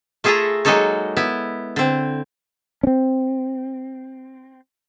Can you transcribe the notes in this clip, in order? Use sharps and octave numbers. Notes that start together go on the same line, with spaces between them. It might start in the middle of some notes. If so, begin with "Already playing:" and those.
A3 F4 G#4 A4 E5 A#5
F#3 G#3 A#3 D#4 A4 C#5
B3 E4
D3 C4
C4 C#4